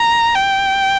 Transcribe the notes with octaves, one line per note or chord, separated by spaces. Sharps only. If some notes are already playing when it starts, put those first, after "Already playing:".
Already playing: A#5
G5